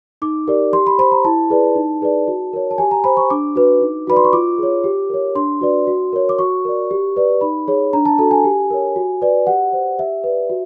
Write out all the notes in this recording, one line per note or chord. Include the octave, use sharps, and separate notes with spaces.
D#4 D6
G4 A#4 D5
G4 C6
B5
C5 B5
A#5
E4 A5
G#4 B4 D5
D#4
G#4 B4 D5
F#4
A#4 C#5
A5
G4 G#5
A#5
C5 B5
C#6
D4 D6
F#4 B4
D#4
F#4 B4 D5 B5
C6
C#6
F4 D6
G#4 C#5
G4
A#4 C#5
D4 C6
F#4 B4 D5
F#4
A#4 C#5
D6
F#4 C#6
A#4 D5
G4
B4 D5
D#4 B5
G#4 C#5
D4 A#5
A5
F#4 A4 A5
G#5
G4
A#4 C#5
F#4
B4 D5
G4 F#5
C5
G4 E5
B4 D5
F#4